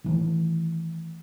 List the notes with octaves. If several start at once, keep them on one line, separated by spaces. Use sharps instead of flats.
D#3 E3 A3